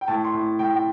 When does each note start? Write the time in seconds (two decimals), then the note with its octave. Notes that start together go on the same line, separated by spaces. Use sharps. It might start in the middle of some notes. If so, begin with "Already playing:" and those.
0.01 G5
0.08 A2 A5
0.24 C6
0.33 A2
0.59 A2 G5
0.74 G5